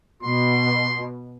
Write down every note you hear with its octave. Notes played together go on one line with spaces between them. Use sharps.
B2 C6